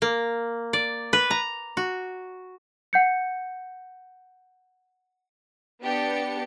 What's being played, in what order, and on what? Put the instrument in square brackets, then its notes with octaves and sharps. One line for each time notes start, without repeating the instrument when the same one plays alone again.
[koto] A#3
D5
B4
A#5
F#4
[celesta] F#5 G6 C#7
[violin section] B3 D4 G4 C#7